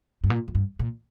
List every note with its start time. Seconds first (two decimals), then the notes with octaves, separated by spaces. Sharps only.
0.24 G2
0.30 A#2
0.48 F2
0.55 G2
0.79 A#2